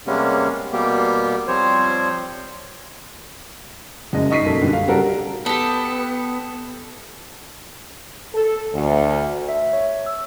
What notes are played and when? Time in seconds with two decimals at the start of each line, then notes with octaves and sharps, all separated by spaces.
0.07 C3 G3 G#3 A#3 B3 C#4
0.73 B2 G3 A#3 B3 G4
1.48 F3 G3 C4 C5 C#5
4.13 F#1 F#2 G#3 D#5
4.30 D#4 D#5 C#6 B6 C7 D#7
4.44 B1 F#2 A#3 A4
4.62 G2 D3
4.73 F5
4.87 C#3 G3 F#4 A4 A#4
5.46 B3 G4 A4
8.35 A4
8.74 D2
9.49 E5
9.73 C#5
10.06 E6